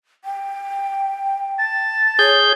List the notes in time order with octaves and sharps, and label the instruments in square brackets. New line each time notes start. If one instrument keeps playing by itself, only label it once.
[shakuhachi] G5
[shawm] A5
[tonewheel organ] G#4 G6 [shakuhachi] C#5